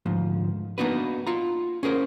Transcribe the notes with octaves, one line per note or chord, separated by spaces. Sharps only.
D2 G#2 F3
A#3 B3 D4 D#4 F#4 B4
F4 A#5
C#4 G#4 A#4 C5